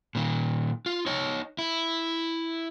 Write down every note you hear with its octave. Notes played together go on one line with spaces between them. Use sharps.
A#2 D#3
F4
D#4 C#5
E4